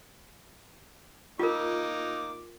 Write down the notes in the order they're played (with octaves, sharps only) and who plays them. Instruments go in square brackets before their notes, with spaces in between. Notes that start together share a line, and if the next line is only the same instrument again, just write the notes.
[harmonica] A#3 D#4 D6 [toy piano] F4 A#4